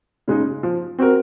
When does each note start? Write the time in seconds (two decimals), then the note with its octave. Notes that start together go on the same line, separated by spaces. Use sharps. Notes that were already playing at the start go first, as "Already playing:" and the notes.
0.28 C#3 G#3 D#4
0.63 F3
0.98 C4 F#4 A#4